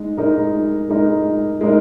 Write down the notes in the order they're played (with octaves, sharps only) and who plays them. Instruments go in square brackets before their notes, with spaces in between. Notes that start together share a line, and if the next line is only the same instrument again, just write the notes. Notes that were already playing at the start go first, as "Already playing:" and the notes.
Already playing: [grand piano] G#3 D#4
G#3 D#4 A#4
G#3 D#4 A#4
G#3 D#4 A#4